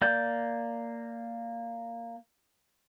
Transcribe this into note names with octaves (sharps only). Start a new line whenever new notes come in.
A#3 D5 G6